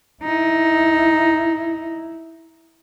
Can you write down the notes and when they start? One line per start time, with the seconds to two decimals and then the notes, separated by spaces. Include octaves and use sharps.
0.23 D#4 E4